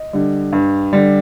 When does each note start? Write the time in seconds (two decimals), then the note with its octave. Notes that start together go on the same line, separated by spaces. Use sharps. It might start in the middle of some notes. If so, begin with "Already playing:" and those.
Already playing: D#5
0.13 D3 G3
0.53 G2
0.93 D3 G3